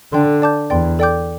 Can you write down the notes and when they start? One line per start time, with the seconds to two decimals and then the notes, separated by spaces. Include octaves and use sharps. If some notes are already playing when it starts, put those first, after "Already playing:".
0.13 D3 A4 D5 G5 C6
0.42 D5 A5 D6 G6
0.70 E2 D5 G5 C6
0.99 A4 D5 G5 D6 G6